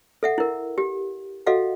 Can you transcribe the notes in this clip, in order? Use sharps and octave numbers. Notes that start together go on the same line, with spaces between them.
A4 E5 F#5
E4 A#4
G4
F#4 A4 D#5 F5 F#5